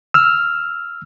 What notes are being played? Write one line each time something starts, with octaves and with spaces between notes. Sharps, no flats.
E6 F6